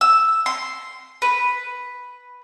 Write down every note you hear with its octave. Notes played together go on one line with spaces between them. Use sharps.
E6
C6
B4